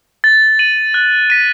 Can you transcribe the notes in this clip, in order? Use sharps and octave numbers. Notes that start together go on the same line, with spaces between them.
A6
D#7 F#7
F#6
B6 D#7